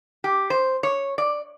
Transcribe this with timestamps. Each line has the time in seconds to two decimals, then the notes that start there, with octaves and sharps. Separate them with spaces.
0.24 G4
0.50 C5
0.83 C#5
1.18 D5